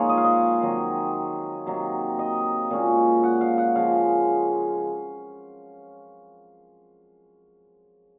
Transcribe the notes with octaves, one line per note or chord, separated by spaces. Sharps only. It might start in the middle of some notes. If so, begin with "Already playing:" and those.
Already playing: A#2 F3 G#3 D#4 F4 G#4 C#5
D#5
F5
D#5
D#3 F#3 C4
C3 F#3 A#3 D#4
D#5
A#2 G#3 C#4
F#5
F5
F#5
C#3 F3 G#3 F5